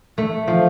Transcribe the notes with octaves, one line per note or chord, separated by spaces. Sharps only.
A3
F3